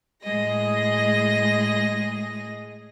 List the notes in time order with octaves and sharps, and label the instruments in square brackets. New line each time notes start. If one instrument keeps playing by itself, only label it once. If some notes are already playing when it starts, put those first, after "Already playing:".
[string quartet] A2 G#3 G#4 D#5 A#6